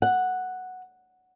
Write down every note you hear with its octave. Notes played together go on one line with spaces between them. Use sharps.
F#5